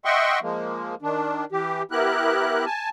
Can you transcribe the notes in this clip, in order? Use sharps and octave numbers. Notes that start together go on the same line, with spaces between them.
D#5 E5 F#5 G5 C6 C#6
F3 G#3 A#3
D#3 D4
E3 G4
B3 E4 G4 A#4 F#6
G#5 A5